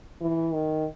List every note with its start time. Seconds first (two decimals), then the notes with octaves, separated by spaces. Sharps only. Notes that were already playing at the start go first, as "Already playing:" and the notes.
0.21 E3
0.53 D#3